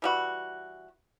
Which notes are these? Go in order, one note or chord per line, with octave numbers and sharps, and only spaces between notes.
E3 G3 F#4